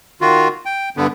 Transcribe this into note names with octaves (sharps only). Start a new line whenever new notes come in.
D#3 F4 F#4
G5
G2 D3 B3